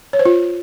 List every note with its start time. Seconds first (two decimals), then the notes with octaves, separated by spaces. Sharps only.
0.13 C#5
0.19 C5
0.25 F4